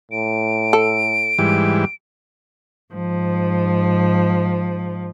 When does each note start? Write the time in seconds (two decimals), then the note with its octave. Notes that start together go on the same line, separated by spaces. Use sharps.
0.11 A2 D7
0.73 A4
1.39 G#2 E3 G3
2.94 G#2 F3